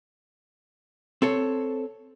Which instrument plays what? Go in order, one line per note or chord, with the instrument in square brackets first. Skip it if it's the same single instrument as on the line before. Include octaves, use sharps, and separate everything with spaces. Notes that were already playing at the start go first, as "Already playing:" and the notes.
[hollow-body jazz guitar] C4 A4 C#5